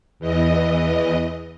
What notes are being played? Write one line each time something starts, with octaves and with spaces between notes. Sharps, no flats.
E2 E3 D#5